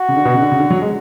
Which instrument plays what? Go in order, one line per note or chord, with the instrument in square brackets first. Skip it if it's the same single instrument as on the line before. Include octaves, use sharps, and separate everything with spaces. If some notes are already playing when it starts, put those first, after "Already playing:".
Already playing: [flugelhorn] F#4
[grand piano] C#3
D3
B2
C#3
D3
C#3
D3
F#3
G#3